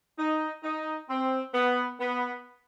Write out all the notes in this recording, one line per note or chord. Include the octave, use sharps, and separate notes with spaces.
D#4
D#4
C4
B3
B3